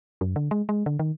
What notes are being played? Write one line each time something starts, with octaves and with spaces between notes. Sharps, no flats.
F#2
D3
G#3
G#3
D3
D#3